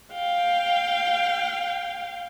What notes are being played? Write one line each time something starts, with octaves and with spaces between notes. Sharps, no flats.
F5 G5